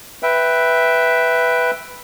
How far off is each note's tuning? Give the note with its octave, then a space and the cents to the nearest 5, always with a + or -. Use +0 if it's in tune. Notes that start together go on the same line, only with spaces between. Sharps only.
B4 +0 E5 +0 G5 +0